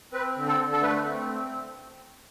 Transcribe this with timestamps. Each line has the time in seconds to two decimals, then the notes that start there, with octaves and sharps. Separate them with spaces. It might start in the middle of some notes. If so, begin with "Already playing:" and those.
0.13 C4 B4
0.36 D3
0.47 A4
0.59 D3
0.72 A4
0.82 A3 B4
1.05 C4